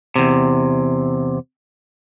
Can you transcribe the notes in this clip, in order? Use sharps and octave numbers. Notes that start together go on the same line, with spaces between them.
E2 C3